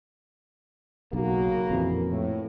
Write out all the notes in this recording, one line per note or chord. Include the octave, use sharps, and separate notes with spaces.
B1 C#3 A#3 F#4
F2 A#2 E3
A2